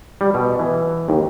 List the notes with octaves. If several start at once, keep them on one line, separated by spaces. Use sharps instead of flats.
G3
B2
E3
D#2